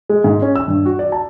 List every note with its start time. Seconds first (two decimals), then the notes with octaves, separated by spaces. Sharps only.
0.09 G#3
0.24 G#2
0.42 C#4
0.56 E6
0.68 G2
0.85 F#4
0.99 D5
1.12 A5